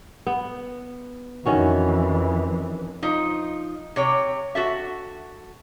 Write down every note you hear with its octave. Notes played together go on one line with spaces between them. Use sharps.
B3
F2 D#3 E3 C#4 F#4
F3 D#4 D#5
C3 C#5 G5
F#4 A4 E5